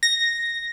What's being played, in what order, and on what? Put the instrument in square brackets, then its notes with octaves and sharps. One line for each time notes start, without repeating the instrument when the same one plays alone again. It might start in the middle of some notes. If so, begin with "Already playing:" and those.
[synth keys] A#6